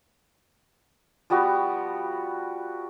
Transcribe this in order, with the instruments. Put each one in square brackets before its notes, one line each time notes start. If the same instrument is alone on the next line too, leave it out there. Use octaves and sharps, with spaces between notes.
[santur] F3 G3 B3 F#4